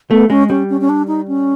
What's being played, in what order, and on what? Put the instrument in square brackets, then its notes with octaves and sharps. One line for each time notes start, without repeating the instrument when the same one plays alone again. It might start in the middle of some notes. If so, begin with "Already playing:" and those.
[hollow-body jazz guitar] A3 [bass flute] B3
[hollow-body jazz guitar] G#3 [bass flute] C#4
[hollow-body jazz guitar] G3 [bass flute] C#4
[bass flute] C#4
C#4
D4
D#4
C#4